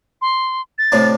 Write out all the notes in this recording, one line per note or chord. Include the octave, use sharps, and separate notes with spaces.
C6
A6
A2 C3 D4